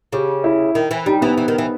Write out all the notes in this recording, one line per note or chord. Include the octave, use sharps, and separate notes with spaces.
C#3 G4
E4
D#3
E3
G3 D#4
E3 B3
E3
D#3
E3